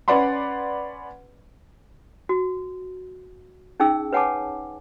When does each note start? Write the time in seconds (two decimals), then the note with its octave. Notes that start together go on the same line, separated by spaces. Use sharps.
0.08 C#4 B4 D5 F#5 B5 C6
2.29 F#4
3.80 C#4 D#4 G#4 G5 E6
4.13 B4 C#5 F#5 G#5 A5 D6